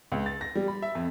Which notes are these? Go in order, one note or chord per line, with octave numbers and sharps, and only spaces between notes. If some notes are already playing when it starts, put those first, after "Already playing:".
C#2
A6
A#6
G3
B5
E5
F2